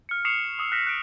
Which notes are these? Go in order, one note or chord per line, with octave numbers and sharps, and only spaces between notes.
F6 C#7
C#6 D#6 C7 C#7 E7 F7
C#6 D#6 E6 F7
F6 F#6 A#6 B6 E7
F#6 D7